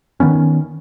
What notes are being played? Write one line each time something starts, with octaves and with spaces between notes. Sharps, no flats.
D#3 F#3 B3 C#4